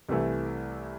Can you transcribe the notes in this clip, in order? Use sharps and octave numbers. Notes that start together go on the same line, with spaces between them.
C2 C3 E3 A3 E4